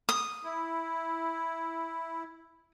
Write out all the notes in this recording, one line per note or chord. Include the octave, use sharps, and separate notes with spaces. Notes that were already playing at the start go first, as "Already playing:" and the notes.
D#6
E4